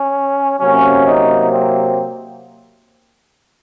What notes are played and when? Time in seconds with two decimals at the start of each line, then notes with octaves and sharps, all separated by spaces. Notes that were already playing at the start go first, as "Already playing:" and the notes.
Already playing: C#4
0.60 C3 F#3 A#3 C#4
1.07 D#4
1.53 C4